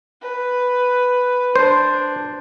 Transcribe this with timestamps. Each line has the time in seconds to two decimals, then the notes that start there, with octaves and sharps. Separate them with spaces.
0.21 B4
1.56 D4 C5